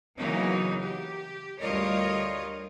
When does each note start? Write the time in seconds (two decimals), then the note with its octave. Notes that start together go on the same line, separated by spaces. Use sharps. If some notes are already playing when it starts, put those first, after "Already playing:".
0.17 C#3 E3 F#3 A#3 B3 D#4
0.83 G4
1.60 D2 G3 F4 A#4 C#5 D#5